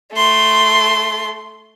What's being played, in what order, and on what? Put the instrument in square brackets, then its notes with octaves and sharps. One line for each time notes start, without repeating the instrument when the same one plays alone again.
[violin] A3 C6